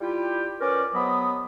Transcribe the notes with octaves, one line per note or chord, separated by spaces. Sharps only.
G3 E4 F4 G4
C#4 A#4 B4 D5
C3 F#3 B3 D#5 B5